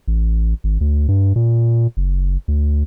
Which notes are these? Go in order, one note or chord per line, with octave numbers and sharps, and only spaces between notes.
A1
G#1
D2
G2
A#2
F#1
D2